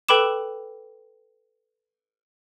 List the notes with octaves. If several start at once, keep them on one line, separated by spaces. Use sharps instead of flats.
A4 B4 G5 B5 D6 E7